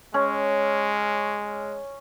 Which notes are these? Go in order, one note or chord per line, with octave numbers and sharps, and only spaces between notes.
G#3 C#4